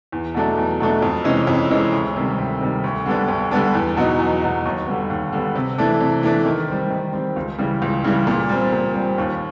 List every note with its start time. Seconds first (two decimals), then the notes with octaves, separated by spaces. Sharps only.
0.12 E2
0.34 B2 F#3 A3 D4
0.58 E2
0.80 B2 F#3 A3 D4
1.02 F2
1.24 C3 E3 G#3 C#4
1.47 F2
1.70 C3 E3 G#3 C#4
1.92 D2
2.16 C3 D#3 G3
2.38 D2
2.61 C3 D#3 G3
2.84 D2
3.06 D3 G3 B3 D4
3.28 D2
3.51 D3 G3 B3 D4
3.75 E2
3.97 B2 F#3 B3 D#4
4.19 E2
4.42 B2 F#3 B3 D#4
4.65 D#2
4.87 D3 G3 B3
5.10 D#2
5.32 D3 G3 B3
5.55 C3
5.78 E3 A3 D4
6.00 C3
6.23 E3 A3 D4
6.45 D#3
6.68 G3 C4
6.90 D#3
7.13 G3 C4
7.36 C#2
7.58 C#3 E3 G3
7.82 C#2
8.04 C#3 E3 G3
8.27 A#2
8.49 G3 C4
8.72 A#2
8.94 G3 C4
9.18 D#2